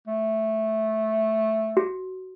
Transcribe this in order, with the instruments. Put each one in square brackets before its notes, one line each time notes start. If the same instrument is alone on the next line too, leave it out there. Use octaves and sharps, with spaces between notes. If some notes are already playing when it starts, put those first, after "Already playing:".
[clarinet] A3
[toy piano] F#4